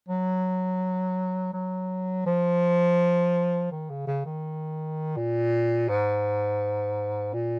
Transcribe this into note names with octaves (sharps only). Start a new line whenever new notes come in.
F#3
F#3
F3
D#3
C#3
C#3
D#3
A#2
G#2
A#2